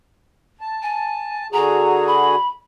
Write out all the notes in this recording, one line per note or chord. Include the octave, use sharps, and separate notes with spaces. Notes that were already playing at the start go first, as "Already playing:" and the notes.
A5
G#5
D3 F#4 G#4 A#5
B5